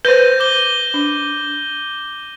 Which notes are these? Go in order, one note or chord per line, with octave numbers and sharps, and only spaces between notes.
B4 C5 G6 A#6 D#7
D6 G7
D4